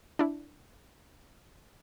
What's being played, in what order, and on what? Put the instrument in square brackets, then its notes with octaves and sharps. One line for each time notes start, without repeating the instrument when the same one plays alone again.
[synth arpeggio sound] D4 E4